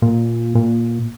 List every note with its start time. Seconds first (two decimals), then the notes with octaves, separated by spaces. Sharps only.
0.02 A#2
0.55 A#2